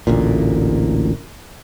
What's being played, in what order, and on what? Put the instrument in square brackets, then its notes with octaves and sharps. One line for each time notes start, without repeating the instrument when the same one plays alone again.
[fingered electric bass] A1 D2 A#2